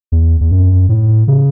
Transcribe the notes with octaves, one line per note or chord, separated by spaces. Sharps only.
E2
E2
F#2
A2
C#3